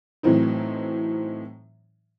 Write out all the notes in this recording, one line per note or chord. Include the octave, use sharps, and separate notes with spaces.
A2 E3 F#3 C4 D#4